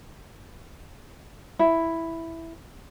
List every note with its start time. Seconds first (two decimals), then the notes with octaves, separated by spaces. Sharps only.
1.59 E4